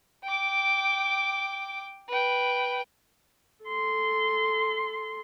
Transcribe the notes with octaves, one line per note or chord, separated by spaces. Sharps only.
G5 D6
B4 G5
A4 C6